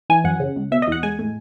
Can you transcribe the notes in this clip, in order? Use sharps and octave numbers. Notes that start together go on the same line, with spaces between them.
E3 G#5
F#2 F#5
C#3
C#2
B2 E5
D#5
E2 F#5
G#3 G#5
A2